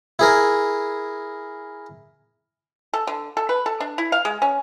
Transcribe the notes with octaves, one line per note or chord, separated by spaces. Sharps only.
E4 G#4 A#4
A4
D3
A4
B4
A4
D4
E4
F5
G#3
C#4